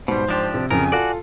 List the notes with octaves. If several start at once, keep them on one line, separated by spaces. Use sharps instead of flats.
G#2 B2 G3 C5
F3 D4 G4
C3
F2 C#3 A#4 G#5
F4 F#4 A4 D5